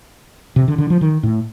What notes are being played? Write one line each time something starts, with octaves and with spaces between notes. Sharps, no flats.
C3
D3
D3
F3
D#3
A2